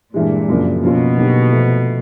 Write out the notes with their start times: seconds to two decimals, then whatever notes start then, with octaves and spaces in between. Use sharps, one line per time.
0.14 G2 A#2 E3 G#3
0.48 F#2 C#3 F3 A#3 D4
0.82 B2 F3 A#3 C#4 F4
1.17 D3 F#3 A#3 D#4 G4
1.52 C3 F3 A3